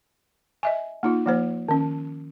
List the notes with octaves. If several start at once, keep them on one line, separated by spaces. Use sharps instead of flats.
D#5 E5 G#5
A#3 D#4 F4
F3 A#3 C5
D#3 C#4